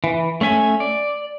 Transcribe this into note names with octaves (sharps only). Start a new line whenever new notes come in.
E3
A3 C#4 E5 G#5
D5